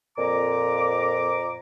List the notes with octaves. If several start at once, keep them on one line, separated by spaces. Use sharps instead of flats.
F2 A#2 A#5 D6